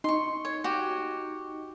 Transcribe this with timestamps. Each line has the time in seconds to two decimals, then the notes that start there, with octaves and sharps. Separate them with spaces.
0.04 D#4 C6 C#6
0.45 C#5
0.64 F#4 G4